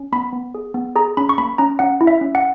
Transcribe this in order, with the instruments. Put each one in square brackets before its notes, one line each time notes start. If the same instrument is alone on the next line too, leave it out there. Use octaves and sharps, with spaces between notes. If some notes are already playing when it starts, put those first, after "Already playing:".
Already playing: [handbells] C#4
B3 B5
B3
G#4
B3
G#4 A#5
C#4 B5
C#6
A#3 B5
C#4 A#5
C#4 F#5
E4
E5
C#4
F#5